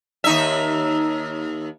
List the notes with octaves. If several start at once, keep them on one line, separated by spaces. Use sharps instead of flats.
D#2 D#4 E5